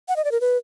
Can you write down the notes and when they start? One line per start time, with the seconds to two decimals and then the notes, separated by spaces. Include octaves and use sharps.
0.08 F#5
0.16 D#5
0.25 D5
0.32 A#4
0.41 B4